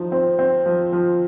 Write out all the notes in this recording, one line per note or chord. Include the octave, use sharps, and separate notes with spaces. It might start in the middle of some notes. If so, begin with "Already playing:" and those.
Already playing: F3 D#4
C4
C4
F3
F3